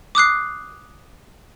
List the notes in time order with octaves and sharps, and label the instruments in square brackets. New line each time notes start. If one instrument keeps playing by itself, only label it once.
[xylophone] D6 D#6 F#6 C7